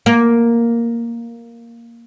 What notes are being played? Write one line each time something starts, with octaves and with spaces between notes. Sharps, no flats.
A#3